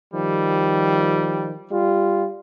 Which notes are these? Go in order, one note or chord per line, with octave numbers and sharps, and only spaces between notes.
D#3 F3 G3
G3 F4